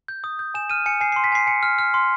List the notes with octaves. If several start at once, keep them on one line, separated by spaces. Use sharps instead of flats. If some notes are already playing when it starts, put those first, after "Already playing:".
G6
D#6
G6
G#5 E7
F6 D#7
G#5 C#7
G#5 C7
C7
C6
B6
G#5 C7
G#5 C#7
F6
F6
C6